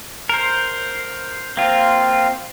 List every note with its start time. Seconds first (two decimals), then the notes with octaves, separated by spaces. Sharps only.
0.29 A#4 C5
1.57 A#3 C4 F4 F5